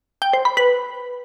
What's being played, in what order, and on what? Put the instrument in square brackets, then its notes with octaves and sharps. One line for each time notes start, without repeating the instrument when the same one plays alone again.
[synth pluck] G5
C5
B5
B4